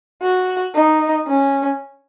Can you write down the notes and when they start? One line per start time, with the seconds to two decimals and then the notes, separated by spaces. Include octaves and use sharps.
0.23 F#4
0.76 D#4
1.27 C#4